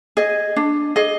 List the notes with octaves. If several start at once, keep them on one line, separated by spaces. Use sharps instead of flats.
G#4 D#5
D4
G#4 D#5